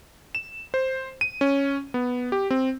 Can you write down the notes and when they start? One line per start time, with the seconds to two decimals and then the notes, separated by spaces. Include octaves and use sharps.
0.35 E7
0.74 C5
1.21 D#7
1.41 C#4
1.94 B3
2.32 G4
2.50 C4